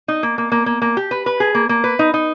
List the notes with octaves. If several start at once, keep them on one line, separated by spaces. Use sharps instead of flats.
D#4
A#3
A#3
A#3
A#3
A#3
G4
B4
B4
G#4
A#3
A#3
B4
D#4
D#4